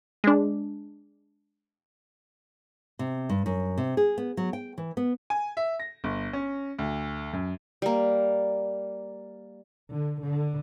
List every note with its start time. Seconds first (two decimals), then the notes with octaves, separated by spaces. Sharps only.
0.24 G#3 D4
2.99 C3
3.29 G2
3.46 F#2
3.78 C3
3.97 G#4
4.18 B3
4.37 F#3
4.53 G5
4.78 E3
4.97 B3
5.30 G#5
5.57 E5
5.80 A#6
6.04 G1
6.33 C#4
6.79 D2
7.33 F#2
7.82 G3 A#3
9.91 D3
10.22 D3